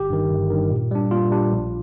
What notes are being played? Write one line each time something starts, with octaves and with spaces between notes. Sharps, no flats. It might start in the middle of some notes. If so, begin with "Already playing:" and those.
Already playing: G1 G4
G2 D#3
G1
G2 D#3
A#2
G3 D4
A#2 F4
G3 D4
A#1